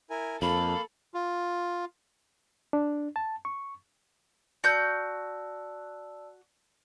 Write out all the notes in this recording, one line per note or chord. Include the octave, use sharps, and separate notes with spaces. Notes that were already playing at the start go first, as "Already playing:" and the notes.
E4 A#4 G#5
F2 A#3 A4 F5 B5
F4
D4
A5
C#6
F#4 D5 A5 E6 G6